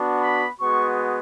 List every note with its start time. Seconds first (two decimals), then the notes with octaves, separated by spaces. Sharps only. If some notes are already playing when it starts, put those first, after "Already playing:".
Already playing: B3 D4 F#4
0.22 B5
0.60 G#3 B3 F#4 C#6